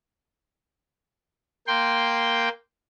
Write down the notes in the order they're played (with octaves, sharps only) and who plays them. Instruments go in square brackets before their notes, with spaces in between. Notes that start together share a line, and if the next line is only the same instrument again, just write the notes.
[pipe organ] A#3 G5 C6